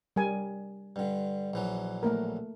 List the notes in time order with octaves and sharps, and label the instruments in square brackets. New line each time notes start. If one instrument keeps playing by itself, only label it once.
[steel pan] G3 A#4 G#5
[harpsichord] G2 D3
A#1 E3 F#3
[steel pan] A3 A#3 A#4